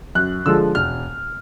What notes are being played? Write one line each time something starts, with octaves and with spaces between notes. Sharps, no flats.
F#2 F#6
D3 F3 G#3 E6
E1 F6